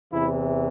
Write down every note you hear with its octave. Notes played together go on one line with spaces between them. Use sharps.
E2 C3 E3 E4